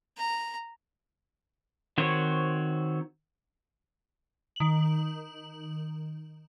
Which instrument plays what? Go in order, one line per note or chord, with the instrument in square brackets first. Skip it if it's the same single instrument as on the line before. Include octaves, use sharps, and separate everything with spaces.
[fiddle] A#5
[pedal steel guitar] D#3 C4 F#4 C5 C#5
[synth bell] D#3 F#7